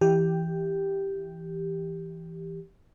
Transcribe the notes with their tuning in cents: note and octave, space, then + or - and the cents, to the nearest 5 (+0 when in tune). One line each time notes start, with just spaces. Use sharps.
E3 +0 G4 +0